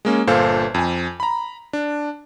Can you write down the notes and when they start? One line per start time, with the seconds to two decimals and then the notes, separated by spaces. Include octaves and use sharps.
0.05 G#3 A#3 C#4
0.27 G1 A#2 A4 C5 F5 A5
0.74 F2 G#5
1.20 A#5 B5
1.73 D4